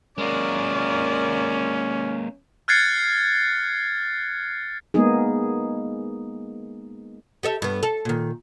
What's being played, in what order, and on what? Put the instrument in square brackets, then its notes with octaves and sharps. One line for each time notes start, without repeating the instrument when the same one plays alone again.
[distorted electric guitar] G#3 A#3 [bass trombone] C#4 [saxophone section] F4 F#4 A#4 [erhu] D5
[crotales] F6 F#6 G#6 A6 C7 C#7
[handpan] G#3 A#3 B3 D#4 G#4
[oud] G4 A4 E5
G2 B3
A4
A#2 D#3